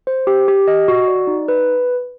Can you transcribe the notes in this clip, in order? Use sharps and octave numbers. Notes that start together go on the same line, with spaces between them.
C5
G4
G4
D#5
F#4
D5
D#4
B4